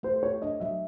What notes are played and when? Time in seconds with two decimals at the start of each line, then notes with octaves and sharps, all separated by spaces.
0.03 A3 C5
0.23 A3 C#5
0.42 D4 D#5
0.60 F#3 E5